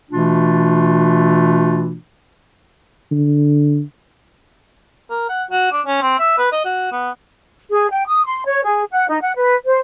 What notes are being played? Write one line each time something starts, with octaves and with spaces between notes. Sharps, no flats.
B2 E3 A3 D4 F4
D3
A#4
F#5
F#4
D4
C#4
C4
E5
B4
D#5
F#4
B3
G#4
G5
D#6
C6
C#5
G#4
F#5
D#4
F#5
B4
C5